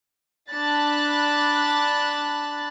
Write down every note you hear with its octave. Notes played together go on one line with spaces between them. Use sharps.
D4 A5 B5 F#6 A6